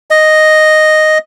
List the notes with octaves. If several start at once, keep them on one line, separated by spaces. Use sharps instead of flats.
D#5